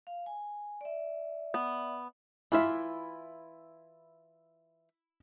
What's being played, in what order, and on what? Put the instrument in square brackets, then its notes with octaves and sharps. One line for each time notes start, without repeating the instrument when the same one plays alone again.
[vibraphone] F5
G#5
D5 E5
[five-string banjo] B3
[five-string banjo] E3 F4 E5 [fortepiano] E4